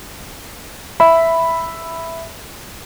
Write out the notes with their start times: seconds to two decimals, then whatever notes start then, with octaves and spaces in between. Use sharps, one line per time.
1.00 E5 B5